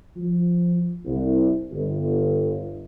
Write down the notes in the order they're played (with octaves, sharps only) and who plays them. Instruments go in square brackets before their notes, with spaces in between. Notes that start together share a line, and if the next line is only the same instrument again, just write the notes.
[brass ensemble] F3
C2
G1